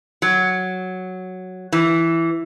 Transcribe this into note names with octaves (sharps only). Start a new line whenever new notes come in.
F#3
E3